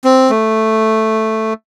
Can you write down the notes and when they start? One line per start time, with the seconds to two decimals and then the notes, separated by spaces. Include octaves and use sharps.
0.04 C4
0.30 A3